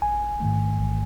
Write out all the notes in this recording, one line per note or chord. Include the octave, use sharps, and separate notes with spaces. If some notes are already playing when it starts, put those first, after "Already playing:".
A1 G#5
G#2 D#3 A3
A1